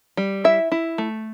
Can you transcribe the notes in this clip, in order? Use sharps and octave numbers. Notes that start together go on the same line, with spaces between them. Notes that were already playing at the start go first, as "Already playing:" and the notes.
G3
E4 E5
E4
A3